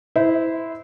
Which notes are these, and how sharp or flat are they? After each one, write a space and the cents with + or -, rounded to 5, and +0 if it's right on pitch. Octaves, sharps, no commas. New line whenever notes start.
E4 -15 C5 -25